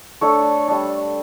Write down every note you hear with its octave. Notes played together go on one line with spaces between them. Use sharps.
A3 D4 A4 C#5
G3 D4